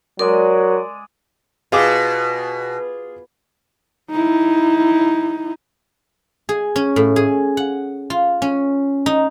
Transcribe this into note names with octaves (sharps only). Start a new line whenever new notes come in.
F#3 G#3 G#4 A#4 D5
B2 F4 G#4 D6
D#4 E4
G#4
C#4
A2
G#4
F#5
F4
C#4
D#4